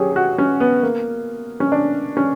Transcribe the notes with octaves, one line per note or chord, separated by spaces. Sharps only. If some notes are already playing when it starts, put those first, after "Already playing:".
Already playing: F#3 C#4 G4 G#4
G4
F#4
C#4
B3
A#3
C#4
D4
C#4